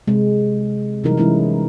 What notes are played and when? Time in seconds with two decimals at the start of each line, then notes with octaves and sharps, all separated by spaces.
0.08 C3 G#3
1.04 C3 E3 F#3 G3 D#4 A#4
1.17 E3 G#3 C#4 D#4 E4